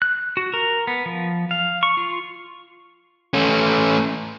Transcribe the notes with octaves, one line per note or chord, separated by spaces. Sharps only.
F#6
F#4
A#4
B3
F3
F5
C#6
F4
A3 C#4